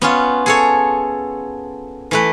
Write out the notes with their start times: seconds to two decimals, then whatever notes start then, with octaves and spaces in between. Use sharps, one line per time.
0.02 B3 C#4 F4
0.46 G#4 A4 C#5
2.11 E3 A3 B4